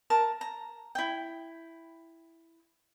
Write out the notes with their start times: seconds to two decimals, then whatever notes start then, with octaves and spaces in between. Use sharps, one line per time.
0.10 A#4 A5 A#5
0.41 A#5
0.95 E4 G5